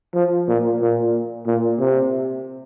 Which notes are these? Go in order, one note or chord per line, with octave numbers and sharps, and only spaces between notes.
F3
A#2
A#2
A#2
C3